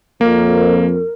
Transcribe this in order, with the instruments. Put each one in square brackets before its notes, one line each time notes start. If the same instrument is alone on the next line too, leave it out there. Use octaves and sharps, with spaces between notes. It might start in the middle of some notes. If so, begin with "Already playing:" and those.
[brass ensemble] F2 [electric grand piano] A#3 [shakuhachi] A#4